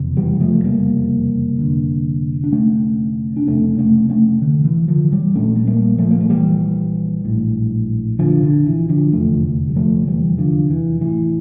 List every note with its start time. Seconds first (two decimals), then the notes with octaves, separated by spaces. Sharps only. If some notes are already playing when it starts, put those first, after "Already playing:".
Already playing: F1 E2 C#3
0.17 E3 G3
0.40 F3 A3
0.64 G3 A#3
1.58 E2 D3
1.63 F1
2.44 D4
2.52 A3 C#4
3.37 D4
3.47 F1 F2 C#3 A3 C#4
3.79 A3 C#4
4.09 A3 C#4
4.42 D3
4.65 E3
4.88 D3 F3
5.12 E3 G3
5.35 A#1 A#2 A3 C#4
5.56 A3
5.67 G3 A#3
5.98 F3 A3
6.11 A#3
6.20 A3
6.30 E3 G3
7.25 A#1 A2
8.19 D3 F3
8.43 D3
8.66 E3
8.89 D3 F3
9.13 F1 E2 D3 F3 A3
9.69 G3
9.76 F3 A3
10.07 E3 G3
10.38 D3 F3
10.70 E3
11.01 A1 A2 E3